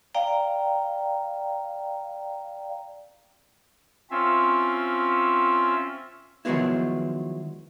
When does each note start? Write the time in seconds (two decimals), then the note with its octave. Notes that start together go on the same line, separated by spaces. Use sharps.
0.15 D5 F5 G5 A#5
4.11 C4 C#4 F4 E5
6.45 D#3 F3 F#3 G#3 B3 E4